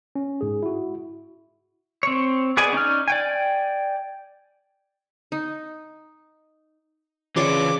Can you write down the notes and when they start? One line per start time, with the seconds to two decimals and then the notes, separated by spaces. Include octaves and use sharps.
0.16 C#4
0.41 G#2 G#4
0.63 E4 F#4
2.03 C4 C#5
2.57 B3 G#4 D5 D#5 G#5
2.73 C#4 D#4 D5 F6
3.08 D5 G5 G#5
5.32 D#4
7.36 C#3 E3 F4 C#5 D5 C6 D6